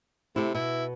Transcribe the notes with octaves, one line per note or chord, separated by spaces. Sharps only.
C3 A3 E4
B2 E4